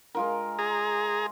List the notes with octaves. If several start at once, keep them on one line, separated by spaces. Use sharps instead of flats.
G#3 F4 A#4
G#4 A#5